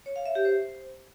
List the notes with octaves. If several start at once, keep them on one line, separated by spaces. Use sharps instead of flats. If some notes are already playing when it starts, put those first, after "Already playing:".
C#5
F5
E5
G4
C5